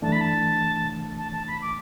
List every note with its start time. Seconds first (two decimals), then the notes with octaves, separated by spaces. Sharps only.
0.02 F#2 E3 A3 D4 A5
0.12 B5
0.20 A5
1.17 A5
1.32 A5
1.47 B5
1.61 D6